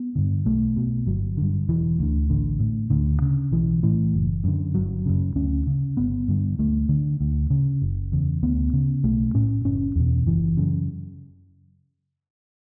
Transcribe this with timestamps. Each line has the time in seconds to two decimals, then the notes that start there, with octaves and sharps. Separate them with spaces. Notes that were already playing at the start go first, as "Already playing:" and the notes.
Already playing: B3
0.15 G2 D3
0.45 B1 A3
0.77 B2
1.07 G1 F#3
1.37 G2 D3
1.69 E1 E3
1.99 D2 D3
2.29 A1 D3
2.60 A2
2.90 D2 D3
3.22 C#3
3.52 B1 E3
3.83 A2 E3
4.14 F#1
4.44 F#2 D3
4.74 G1 F#3
5.06 F#2 C#3
5.36 D2 C#4
5.67 C#3
5.97 G1 B3
6.28 G2 D3
6.59 D2 A3
6.89 D3
7.21 D2
7.50 C#3
7.82 F#1
8.12 E2 C#3
8.43 D2 B3
8.73 C#3
9.03 B1 A3
9.35 A2 C#4
9.65 F#1 C#4
9.95 E2 B2
10.27 F#1 E3
10.57 F#2 C#3